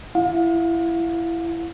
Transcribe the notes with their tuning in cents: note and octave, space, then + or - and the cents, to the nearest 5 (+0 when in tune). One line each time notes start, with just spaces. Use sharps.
E4 +20 F5 +35